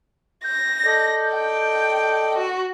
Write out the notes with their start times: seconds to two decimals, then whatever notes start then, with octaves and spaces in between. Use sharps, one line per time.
0.44 G6 A#6
0.85 A4 D5 D#5
1.34 G5
2.38 F#4